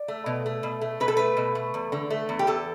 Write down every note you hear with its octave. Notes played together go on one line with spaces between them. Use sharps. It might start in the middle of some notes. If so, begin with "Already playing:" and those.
Already playing: D5
A3
B2
A3
B2
A3
B2 B4
A4
A3 B4
B2
A3
E2
D3
A3
E2
G4
E2 A4